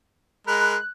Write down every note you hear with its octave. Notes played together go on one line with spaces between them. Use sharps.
G#3 A#4 B5 F#6